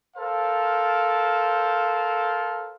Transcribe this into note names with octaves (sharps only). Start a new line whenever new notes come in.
A4 A#4 C5 F5